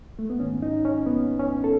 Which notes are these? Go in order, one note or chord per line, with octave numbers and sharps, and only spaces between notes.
A3
B3
G#2 D#3 C#4
D#4
C#4
B3
C#4
A4